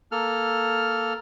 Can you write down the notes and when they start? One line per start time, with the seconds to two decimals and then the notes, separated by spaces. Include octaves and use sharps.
0.12 A#3 A4 F6